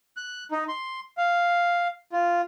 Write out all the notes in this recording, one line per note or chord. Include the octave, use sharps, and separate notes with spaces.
F#6
D#4
C6
F5
F4